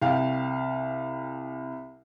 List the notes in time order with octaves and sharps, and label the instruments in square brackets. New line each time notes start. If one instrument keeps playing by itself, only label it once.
[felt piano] C2 F5 G5